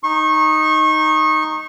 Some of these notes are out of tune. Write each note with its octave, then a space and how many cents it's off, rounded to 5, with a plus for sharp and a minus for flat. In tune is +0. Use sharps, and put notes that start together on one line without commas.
D#4 +0 C#6 -30